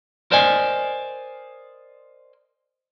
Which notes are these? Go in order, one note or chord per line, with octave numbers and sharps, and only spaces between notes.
A#4 C5 D5 D#5 G#5